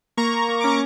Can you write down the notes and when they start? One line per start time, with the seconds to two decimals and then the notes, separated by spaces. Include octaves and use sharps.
0.17 A#3 A#5 C#6
0.33 A#3
0.48 A#3
0.61 C#4 D6
0.70 C#6